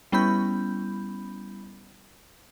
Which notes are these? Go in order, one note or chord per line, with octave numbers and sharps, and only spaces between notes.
G3 B3 C#4 E4 B5 G6